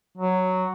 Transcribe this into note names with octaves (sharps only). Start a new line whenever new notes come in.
F#3